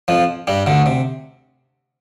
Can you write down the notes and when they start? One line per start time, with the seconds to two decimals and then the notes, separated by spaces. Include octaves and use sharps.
0.08 F2 F3
0.47 G2 G3
0.67 D2 D3
0.86 C3